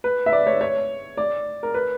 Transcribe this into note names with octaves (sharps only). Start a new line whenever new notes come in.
B4
E5
D5
C#5
C#5
D5
A#4
B4